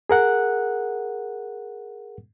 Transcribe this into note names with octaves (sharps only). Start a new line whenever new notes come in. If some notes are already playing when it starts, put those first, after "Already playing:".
G#4 A#4 F#5 F#6